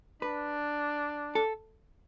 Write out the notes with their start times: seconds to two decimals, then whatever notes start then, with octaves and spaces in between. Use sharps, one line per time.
0.22 D4 B4
1.35 A4